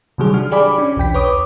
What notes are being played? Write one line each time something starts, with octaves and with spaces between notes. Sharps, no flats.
C3 D#3 F#3 G3 G#4
D4 F#4 F6
G4 G#4 D5 G#5 B5 D6
C#4 D4
B1 E2 G5 B6
B4 C#5 D6 D#6